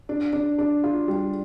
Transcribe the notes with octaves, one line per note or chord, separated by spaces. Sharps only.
D4
D4
D4
F4
G3